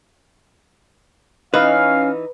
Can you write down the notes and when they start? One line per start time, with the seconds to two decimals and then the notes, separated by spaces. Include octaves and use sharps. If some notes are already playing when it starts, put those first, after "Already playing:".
1.54 E3 C#4 D#4 B4 F5 F6